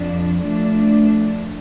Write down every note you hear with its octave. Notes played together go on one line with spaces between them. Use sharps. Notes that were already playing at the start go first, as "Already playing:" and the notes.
Already playing: F2 F3 D4
F3 A3 D4